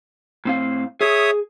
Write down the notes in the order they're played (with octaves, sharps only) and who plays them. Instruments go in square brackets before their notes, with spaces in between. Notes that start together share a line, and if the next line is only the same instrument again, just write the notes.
[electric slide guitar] A2 C4 F5
[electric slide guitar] G#4 [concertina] C#5 E5 D#6